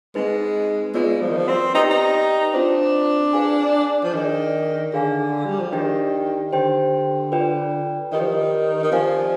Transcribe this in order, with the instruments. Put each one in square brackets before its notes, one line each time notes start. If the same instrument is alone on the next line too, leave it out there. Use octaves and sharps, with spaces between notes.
[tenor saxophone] G#3 [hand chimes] C4 D#4 B4
[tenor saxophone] G#3 [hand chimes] B3 F4 B4 D5
[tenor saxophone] F3
D#3
F3
C4
[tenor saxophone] D#4 [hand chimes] G4 B4 D5 G5
[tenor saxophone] D#4
[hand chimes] C4 F4 C5 [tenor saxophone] D4
[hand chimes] G#4 B4 F5 G#5
[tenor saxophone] F3
[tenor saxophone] D#3 [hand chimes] D4 G#4 D5
[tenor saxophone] D3 [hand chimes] G#4 D5 F5 G#5
[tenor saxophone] G3
F3
[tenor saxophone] D#3 [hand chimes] D4 G4 D5 G5
[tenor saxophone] D3 [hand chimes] G4 C5 G5
[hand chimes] F4 B4 D5 G5
[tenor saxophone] D#3 [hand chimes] G4 B4 D5
[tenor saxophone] F3
D#3
D#3
[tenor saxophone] F3 [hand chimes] C4 G4 D5 F5 G#5